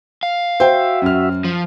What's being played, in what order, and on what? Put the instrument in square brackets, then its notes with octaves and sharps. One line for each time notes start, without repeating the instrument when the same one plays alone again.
[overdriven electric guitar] F5
[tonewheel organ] F#4 E5 [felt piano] C5 G5
[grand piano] F#2 F6
[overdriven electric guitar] F3